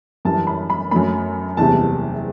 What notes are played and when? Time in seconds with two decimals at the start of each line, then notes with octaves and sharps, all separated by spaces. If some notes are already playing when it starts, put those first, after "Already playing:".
0.25 F#2 E3 G3 A5
0.47 B5
0.70 B5
0.91 F#2 F#3 A3 B5
1.57 F#1 E2 C3 G3 A5